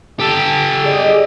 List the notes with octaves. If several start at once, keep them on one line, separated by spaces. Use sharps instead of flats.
G4 A4
G#4 D5 D#5